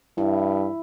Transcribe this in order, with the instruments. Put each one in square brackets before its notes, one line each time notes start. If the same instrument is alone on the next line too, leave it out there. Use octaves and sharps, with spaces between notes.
[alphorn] G2 [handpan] E4